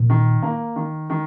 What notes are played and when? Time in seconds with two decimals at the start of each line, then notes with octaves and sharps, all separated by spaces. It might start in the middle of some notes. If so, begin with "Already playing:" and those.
Already playing: A#2
0.10 D#3
0.43 A#3
0.76 D#3
1.10 D#3